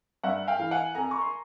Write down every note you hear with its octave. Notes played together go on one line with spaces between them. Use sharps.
G2 E5 F#5
F5 G5
E3
F#5 G#5
F2 G#5 A#5
C#6
C6